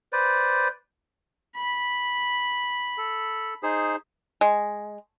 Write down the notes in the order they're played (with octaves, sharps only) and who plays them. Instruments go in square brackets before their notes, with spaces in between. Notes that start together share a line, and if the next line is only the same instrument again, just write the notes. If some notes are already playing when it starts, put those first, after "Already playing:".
[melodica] B4 C5 D5
[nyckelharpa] B5
[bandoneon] A4
D#4 G#4 C5
[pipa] G#3